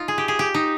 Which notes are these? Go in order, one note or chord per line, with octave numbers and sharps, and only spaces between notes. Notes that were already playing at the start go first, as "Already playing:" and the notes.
Already playing: D#4 F4
G#4
G4
G#4
G4
D#4